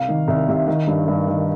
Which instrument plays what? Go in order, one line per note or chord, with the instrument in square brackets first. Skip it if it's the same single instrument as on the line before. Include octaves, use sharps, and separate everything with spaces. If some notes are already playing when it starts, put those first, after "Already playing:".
Already playing: [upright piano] C2 F5
D#3
C2
C3
D#3
G2
G2
D#3